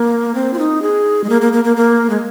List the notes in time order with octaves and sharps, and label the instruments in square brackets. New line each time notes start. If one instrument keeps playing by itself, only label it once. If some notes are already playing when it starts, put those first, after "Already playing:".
Already playing: [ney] A#3
C4
F4
D#4
G#4
G#3
A#3
A#3
A#3
A#3
A#3
G#3